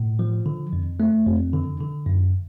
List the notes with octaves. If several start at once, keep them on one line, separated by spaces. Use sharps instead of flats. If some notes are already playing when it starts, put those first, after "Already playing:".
Already playing: A2
F3
D3
F2
A3
F2
D3
D3
F#2